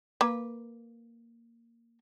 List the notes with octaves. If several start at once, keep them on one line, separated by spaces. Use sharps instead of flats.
A#3 B4